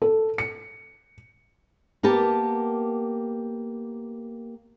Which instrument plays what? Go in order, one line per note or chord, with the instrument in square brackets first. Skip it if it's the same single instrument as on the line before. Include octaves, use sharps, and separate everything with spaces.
[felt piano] A4
C#7
[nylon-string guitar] A#3 B3 G4 A#4 A5